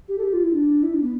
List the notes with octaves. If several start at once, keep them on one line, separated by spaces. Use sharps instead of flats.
G4
A4
G4
F4
E4
D4
E4
D4
B3